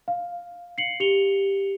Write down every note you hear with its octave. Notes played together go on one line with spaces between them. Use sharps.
F5
C7 C#7 F#7
G4 C#7 F7 G7